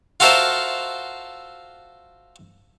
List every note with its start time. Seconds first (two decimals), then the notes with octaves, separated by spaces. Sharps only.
0.20 F4 F#4 A4 A#4 C5 E5